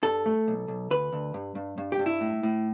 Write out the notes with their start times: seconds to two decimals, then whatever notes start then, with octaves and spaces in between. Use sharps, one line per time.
0.03 G2 A4
0.26 A3
0.48 B1
0.68 B1
0.91 D2 B4
1.13 D2
1.34 G2
1.55 G2
1.78 G2
1.92 G4
1.99 G2
2.06 E4
2.21 A2
2.43 A2